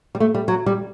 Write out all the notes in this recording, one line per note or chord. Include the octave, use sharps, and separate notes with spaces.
G3
A3
G3
F#3
G3